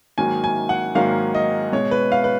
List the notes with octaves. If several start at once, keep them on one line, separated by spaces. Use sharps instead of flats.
G#2 D#3 F#3 A#3 G#5
G#5
F#5
G#2 D#3 F#3 A#3 F5
D#5
B2 G#3 C#5
B4
F5
B4